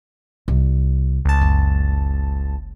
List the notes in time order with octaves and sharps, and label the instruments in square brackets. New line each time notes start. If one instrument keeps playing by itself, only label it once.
[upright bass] C2
[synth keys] C#2 A5
[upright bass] F#1